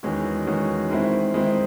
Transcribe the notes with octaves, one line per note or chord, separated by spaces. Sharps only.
E2 D#3 G#3 C#4 F#4
E2 D#3 G#3 C#4 F#4
D#3 G#3 C4 E4
D#3 G#3 C4 E4